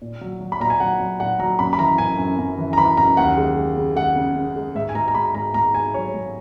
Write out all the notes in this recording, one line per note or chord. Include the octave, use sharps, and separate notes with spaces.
A#2
F#3
F#3
B5
A#2 A#5
G#5
F#3 F#5
F#3
A#2 F#5
F#3 A#5
F#2 B5
B5
E3 A#5
F#2 G#5
F#2
F#2
E3
A#5
E3 B5
F#2 A#5
D#2 F#5
G#3
G#3
C#3
G#3 F#5
C#3
C#3
G#3
G#2 E5
G#5
G#2 A#5
A#5
G#2 B5
G#2 A#5
G#2 A#5
G#2 G#5
F#3 C#5
G#2